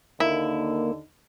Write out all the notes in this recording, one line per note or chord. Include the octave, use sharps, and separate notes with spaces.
D#2 D3 A#3 D#4 E4